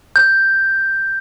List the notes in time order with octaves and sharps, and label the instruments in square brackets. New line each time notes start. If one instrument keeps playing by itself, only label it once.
[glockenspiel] G6